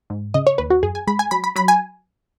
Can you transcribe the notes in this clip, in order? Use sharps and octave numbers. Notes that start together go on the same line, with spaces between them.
G#2
C#3 D#5
C#5
D#2 B4
F#4
F#2 G#4
G#5
G#3 B5
G#5
F#3 B5
B5
F#3 B5
G#5